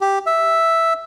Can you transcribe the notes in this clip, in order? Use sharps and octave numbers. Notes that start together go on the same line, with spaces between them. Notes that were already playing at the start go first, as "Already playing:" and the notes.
G4
E5